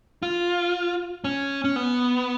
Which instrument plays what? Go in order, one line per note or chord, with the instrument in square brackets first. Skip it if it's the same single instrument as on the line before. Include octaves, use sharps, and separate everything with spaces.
[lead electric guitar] F4
C#4
C#4
B3